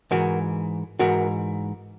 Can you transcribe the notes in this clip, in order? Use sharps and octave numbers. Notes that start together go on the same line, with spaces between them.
G#2 E3 F#4 A#4
G#2 E3 F#4 A#4